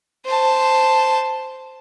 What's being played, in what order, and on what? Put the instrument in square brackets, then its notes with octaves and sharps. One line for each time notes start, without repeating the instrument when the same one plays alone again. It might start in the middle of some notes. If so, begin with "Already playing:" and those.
[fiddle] C5 A5